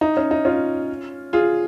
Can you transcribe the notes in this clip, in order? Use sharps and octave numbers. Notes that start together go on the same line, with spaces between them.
D#4
C#4
D#4
C#4 F4
F4 G#4